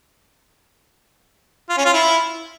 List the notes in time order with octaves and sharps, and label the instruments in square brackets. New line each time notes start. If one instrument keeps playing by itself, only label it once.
[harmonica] F4
C#4
F4
E4